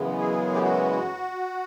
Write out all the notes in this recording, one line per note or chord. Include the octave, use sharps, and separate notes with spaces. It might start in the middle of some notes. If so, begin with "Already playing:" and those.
Already playing: F#2 C#3 E3 G#3 B3
G#4
G4
F#4